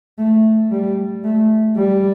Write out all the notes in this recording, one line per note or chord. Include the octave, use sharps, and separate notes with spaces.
A3
G3
A3
G3